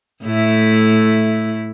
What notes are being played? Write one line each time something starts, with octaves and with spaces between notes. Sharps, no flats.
A2 A3 E4